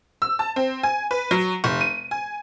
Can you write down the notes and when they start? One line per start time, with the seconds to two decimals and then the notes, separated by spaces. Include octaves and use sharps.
0.22 E6
0.39 A5
0.56 C4
0.83 G#5
1.11 B4
1.31 F#3
1.64 F1
1.81 D#7
2.11 G#5